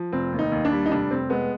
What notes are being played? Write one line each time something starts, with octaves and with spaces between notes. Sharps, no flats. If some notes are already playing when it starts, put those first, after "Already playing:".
Already playing: F3
F1 C4
D#2
D#4
D#2
D4
G3
D#4
F1 D4
F1 C4
G#3 B3